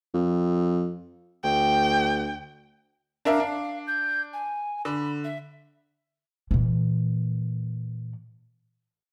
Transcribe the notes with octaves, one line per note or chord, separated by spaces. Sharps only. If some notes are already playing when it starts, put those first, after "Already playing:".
F2
D2 G5
D4 A#4 E5 F5
D4
G6
G#5
D3 B5
E5
A#2 E3